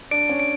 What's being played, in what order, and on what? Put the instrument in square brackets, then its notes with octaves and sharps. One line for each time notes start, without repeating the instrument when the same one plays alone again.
[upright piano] D4 [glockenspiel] D7
[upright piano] C#4
[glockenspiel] D7